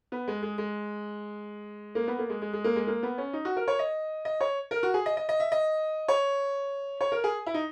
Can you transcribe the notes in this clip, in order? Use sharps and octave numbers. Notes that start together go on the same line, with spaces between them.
B3
G#3
G#3
G#3
A#3
B3
A#3
G#3
G#3
G#3
A#3
G#3
A#3
B3
C#4
D#4
F#4
A#4
C#5
D#5
D#5
C#5
A#4
F#4
G#4
D#5
D#5
D#5
E5
D#5
C#5
C#5
A#4
G#4
E4
D#4